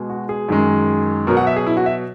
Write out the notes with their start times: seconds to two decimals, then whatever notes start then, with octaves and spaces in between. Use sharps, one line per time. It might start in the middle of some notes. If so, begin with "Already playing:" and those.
Already playing: B2 G#3
0.10 F#4
0.29 G#4
0.48 F#2 D#3 G#3
1.27 B2 F#3 A#4
1.37 F#5
1.47 E5
1.56 G#4
1.67 E4
1.77 F#4
1.86 E5